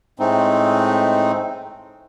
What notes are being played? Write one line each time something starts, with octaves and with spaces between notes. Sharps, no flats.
A2 G#3 A3 C4 D#4